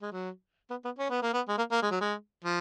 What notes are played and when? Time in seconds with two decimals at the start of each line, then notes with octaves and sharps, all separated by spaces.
0.02 G#3
0.12 F#3
0.70 B3
0.85 B3
0.98 C#4
1.10 B3
1.23 A#3
1.33 B3
1.48 G#3
1.58 A#3
1.71 A#3
1.82 G#3
1.91 F#3
2.01 G#3
2.44 F3